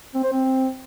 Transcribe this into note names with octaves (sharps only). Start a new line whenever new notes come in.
C4
C5
C4